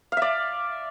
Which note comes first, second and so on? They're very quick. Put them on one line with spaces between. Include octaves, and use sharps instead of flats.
F5 E5 D5